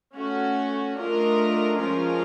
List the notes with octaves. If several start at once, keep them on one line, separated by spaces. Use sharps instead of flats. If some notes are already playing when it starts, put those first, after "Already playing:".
A3 C#4 F#4
A3 D4 F4 A#4 D#5
F3 G#3 C#4 F4 A#4